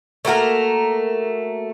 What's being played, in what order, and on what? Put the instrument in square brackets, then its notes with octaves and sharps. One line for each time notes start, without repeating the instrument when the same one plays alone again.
[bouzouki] A3 A#3 F#4 A#4